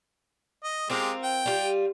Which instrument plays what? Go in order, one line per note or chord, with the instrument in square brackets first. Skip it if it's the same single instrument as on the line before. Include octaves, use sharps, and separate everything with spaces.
[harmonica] D#5
[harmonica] G#3 G4 [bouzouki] C4 F4 A#4
[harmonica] G5
[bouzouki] G3 F4